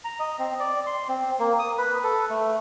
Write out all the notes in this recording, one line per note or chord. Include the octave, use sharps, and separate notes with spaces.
A#5
D#5
C4
D5
C6
C4
A#3
D#6
B4
A4
A3